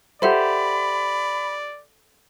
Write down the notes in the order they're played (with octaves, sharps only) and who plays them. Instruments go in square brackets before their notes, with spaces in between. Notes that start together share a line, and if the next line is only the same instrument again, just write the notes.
[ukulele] G4 C5 [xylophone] A4 E5 F#5 [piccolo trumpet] D5 [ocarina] B5